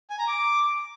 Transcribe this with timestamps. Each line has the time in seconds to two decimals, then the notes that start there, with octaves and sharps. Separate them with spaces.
0.10 G#5
0.19 A#5
0.28 D6